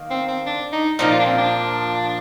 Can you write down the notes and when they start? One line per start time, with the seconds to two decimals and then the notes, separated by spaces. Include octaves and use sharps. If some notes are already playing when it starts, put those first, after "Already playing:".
Already playing: D#3 A#3
0.11 C4
0.28 C4
0.46 D4
0.72 D#4
0.99 A#2 F3 A#3 D#4
1.12 F4
1.19 D4
1.25 C4
1.38 D4